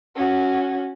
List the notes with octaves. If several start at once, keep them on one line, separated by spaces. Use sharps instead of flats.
C#4 F#4